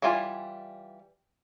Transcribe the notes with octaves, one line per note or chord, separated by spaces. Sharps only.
E3 G3 F4 D5 G#5